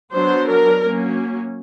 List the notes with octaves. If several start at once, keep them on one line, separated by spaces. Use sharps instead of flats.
F#3 B3 D4 C5
A#4
F#3 A#3 C#4